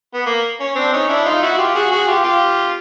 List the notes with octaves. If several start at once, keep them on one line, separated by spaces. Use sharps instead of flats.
B3
A#3
C#4
C4 D4
C#4 D#4
D4 E4
D#4 F4
E4 F#4
F4 G4
F#4 G#4
F#4 G#4
F4 G4
F4 G4